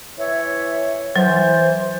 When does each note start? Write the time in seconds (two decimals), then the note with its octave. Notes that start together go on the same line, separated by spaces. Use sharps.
0.19 E3 C#5 E5
1.16 E3 F#3 C5